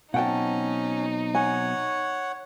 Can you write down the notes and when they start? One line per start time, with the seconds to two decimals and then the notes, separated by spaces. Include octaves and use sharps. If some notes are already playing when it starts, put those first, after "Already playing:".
0.14 B2 F#3 C4 C#4 D#4 F#5 G5 A5
1.35 C#5 F#5 G#5